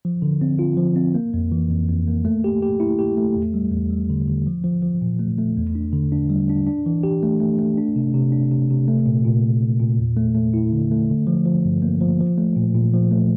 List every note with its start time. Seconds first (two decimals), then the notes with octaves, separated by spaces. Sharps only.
0.05 F3
0.22 D3
0.41 C4
0.59 F4
0.77 F3
0.96 C4
1.15 A#3
1.34 F2
1.52 E3
1.70 F2
1.88 F2
2.07 A#3
2.25 A3
2.44 G4
2.63 G4
2.80 E4
2.99 G4
3.17 A3
3.36 E2
3.54 G3
3.72 E2
3.90 G3
4.10 D3
4.27 D3
4.47 F3
4.64 F3
4.82 F3
5.01 A#2
5.20 A3
5.39 A3
5.57 E2
5.75 D4
5.93 D3
6.12 D4
6.30 G3
6.49 D4
6.67 D4
6.86 E3
7.03 G4
7.23 A3
7.40 A3
7.59 A3
7.78 D4
7.96 C3
8.14 C3
8.32 D4
8.51 C3
8.70 C3
8.88 A3
9.06 A#2
9.25 A#2
9.43 A#2
9.62 A#2
9.80 A#2
9.99 E2
10.17 A3
10.35 A3
10.54 E4
10.72 D3
10.91 A3
11.10 D3
11.27 F3
11.45 F3
11.65 G2
11.82 A#3
12.01 F3
12.20 F3
12.38 A3
12.56 A#2
12.74 A#2
12.93 F3
13.11 A3